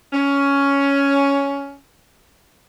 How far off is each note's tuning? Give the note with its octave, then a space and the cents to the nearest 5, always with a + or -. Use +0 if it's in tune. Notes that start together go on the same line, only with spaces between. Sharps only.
C#4 +10